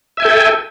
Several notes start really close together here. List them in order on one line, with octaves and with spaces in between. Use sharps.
E5 G#5 G5 A4